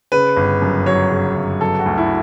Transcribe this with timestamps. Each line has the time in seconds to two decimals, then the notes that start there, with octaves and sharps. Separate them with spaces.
0.12 C#3 B4
0.37 G1
0.62 F#2
0.86 F#3 C#5
1.11 C#3
1.35 G1
1.61 F#3 A4
1.79 F#4
1.86 D2
1.98 E4